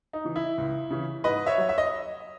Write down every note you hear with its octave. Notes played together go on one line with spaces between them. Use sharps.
D#4
C#3 E3
E4
C#2
C#3 E3
G#2 B4 D#5
C#5 E5
F#3
E5
D#5